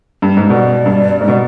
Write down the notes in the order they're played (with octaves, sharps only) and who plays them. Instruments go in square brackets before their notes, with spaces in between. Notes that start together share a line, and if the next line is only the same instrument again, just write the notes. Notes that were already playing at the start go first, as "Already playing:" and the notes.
[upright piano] G2
G#2
[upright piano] B2 [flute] D5
[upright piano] G2
G#2
B2